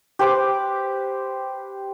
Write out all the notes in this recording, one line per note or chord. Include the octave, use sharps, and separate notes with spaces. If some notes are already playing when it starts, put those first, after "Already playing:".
G4 B4 C5 D6